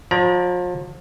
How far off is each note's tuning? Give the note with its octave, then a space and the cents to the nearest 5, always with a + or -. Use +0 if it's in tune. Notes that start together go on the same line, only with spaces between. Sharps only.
F3 +40 D5 +0 A#5 +40